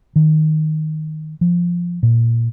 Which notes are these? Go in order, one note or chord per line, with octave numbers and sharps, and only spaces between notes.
D#3
F3
A#2